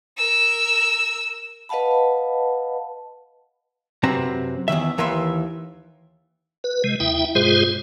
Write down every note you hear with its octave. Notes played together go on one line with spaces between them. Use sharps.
A#4 E6
B4 D#5 F5 F#5 A5 B5
F#2 C3 C4 B4 C5 A#5
E2 G2 D#3 E5
D#2 E3 A#4 B4 E5 C6
B4
C3 G#3
D#2 E4 E5 G5
G2 B2 G#3 F4 G#4 C5